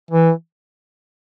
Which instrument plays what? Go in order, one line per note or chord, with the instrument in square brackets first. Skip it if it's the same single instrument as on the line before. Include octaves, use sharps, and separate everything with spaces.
[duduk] E3